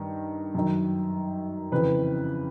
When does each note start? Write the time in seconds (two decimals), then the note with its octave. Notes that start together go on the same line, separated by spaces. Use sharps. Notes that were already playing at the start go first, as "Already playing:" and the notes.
Already playing: G2 D#3
0.55 F#2 D#3
1.72 F2 C#3 E3 B4